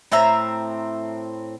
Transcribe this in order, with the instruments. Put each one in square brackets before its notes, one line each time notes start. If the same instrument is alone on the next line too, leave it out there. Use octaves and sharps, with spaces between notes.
[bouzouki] A2 C4 E5 A#5